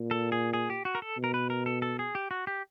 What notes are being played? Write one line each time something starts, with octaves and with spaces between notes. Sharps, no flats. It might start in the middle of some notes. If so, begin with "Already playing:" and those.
Already playing: A#2
A4
G#4
G#4
G4
F#4
A#4
A4
B2
A#4
B4
A#4
A4
A4
G#4
G4
F#4
G4